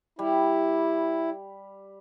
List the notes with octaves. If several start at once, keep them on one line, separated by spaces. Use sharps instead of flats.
G3 E4